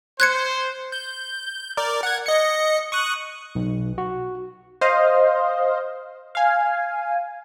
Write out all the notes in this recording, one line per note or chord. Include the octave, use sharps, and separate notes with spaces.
C5 F#6 G#6 C#7
G6
A#4 D5
F#5 G#6
D#5 C#7
C#6 D#6 F#6
B1
F#4
C5 D#5 F5
F5 G#5